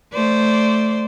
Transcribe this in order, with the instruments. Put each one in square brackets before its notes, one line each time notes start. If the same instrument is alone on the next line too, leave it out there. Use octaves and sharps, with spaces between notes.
[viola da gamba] A3 C5 D5